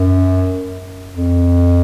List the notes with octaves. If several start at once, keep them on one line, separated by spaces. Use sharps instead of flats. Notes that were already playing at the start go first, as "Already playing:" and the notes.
Already playing: F#2
F2